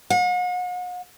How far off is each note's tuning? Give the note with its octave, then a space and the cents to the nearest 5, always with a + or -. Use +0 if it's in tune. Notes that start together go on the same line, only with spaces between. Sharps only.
F#5 -45